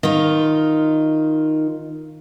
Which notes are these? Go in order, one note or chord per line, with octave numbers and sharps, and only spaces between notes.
D#3 F4